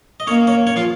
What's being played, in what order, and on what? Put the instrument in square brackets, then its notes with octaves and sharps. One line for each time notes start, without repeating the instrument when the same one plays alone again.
[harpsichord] D#5
[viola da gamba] A#3 [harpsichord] C#4 C#5
[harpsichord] C#4 C#5
C#4 C#5
F3 F4